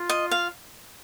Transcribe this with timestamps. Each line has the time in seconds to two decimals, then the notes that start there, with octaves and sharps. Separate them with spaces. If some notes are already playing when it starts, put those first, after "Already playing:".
Already playing: F4
0.10 D#5
0.31 F5